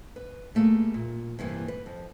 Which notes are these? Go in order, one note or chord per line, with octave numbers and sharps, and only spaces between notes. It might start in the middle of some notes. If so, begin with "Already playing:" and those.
B4
G3 A3 A#3 G#4
A#2
G2 C3 E3 A#3
B4
F2